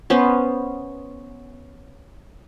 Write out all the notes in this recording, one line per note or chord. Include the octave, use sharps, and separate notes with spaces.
B3 C#4 C5